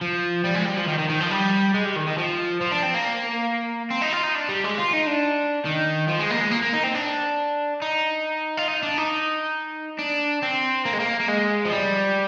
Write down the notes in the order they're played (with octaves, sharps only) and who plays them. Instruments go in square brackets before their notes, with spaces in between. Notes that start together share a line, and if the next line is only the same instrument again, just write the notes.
[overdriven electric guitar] F3
G3
G#3
G3
F3
D#3
D#3
D#3
F3
G3
G#3
G3
D#3
D#3
F3
F3
D4
C4
A#3
C4
D#4
F4
D#4
D4
G3
G#3
F4
D#4
D4
D#3
F3
G#3
A#3
G#3
A#3
A#3
D#4
C4
D4
D#4
F4
D#4
D4
D#4
D4
C4
A#3
G#3
A#3
A#3
G#3
F3
G3